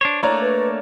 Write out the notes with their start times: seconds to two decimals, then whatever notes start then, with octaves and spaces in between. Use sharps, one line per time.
0.01 D4 C5 C#5
0.23 A3 A#3 D4 C#5 D5 A#5
0.41 B4